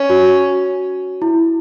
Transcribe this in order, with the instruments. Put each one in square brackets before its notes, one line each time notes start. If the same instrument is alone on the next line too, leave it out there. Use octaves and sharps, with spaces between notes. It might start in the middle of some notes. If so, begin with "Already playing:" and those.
Already playing: [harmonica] C#4
[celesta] F#4
E4